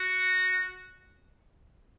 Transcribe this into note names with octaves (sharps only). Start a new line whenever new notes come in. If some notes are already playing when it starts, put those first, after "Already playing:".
Already playing: F#4